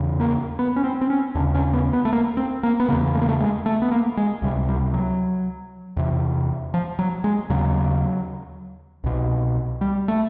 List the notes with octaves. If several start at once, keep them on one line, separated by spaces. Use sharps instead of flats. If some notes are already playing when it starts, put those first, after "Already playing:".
Already playing: E2 C#3
A#3
B3
C#4
C4
C4
C#4
D#2 C#3 D4
C#4
B3
B3
A3
A#3
C4
A#3
B3
E2 C#3 A#3
A3
A#3
A3
G#3
A3
B3
A#3
G#3
C#2 C3 G3
G3
F#3
E2 C3
F3
F#3
G#3
D#2 C#3 F#3
C2 B2
G3
A3